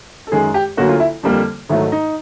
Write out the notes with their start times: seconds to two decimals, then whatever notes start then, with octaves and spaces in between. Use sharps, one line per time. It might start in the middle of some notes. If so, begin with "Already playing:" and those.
0.27 A4
0.32 F#2 D#3 G#3 G#4
0.54 G4
0.77 D2 D3 F#3 A#3 F#4
0.89 F4
1.00 E4
1.23 F2 D3 G3 A#3
1.69 G#2 D#3 F#3 A3 E4
1.92 D#4